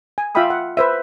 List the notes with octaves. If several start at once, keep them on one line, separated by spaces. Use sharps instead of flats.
G#5
F4 E5 F5 G5 B5 D#6
F#5
B4 C5 E5